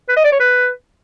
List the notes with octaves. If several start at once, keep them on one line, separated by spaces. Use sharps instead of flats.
B4
D#5
D5
C#5
B4